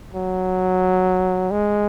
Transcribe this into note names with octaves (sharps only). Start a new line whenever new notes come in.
F#3
G#3